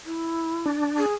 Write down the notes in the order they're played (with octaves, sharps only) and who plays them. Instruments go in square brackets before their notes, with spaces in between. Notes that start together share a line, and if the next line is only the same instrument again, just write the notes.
[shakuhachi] E4
[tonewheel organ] D4
[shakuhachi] G#4